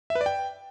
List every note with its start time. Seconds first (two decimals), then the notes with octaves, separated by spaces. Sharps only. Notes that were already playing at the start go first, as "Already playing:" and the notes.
0.10 E5
0.15 B4
0.21 D5
0.26 G5